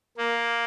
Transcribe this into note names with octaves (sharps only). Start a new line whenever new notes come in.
A#3